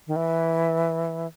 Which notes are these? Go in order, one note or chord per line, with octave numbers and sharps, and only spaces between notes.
D#3
E3